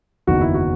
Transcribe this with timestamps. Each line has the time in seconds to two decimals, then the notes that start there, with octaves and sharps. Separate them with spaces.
0.27 F#1 E2 D#3 F#4
0.41 E4
0.54 F#4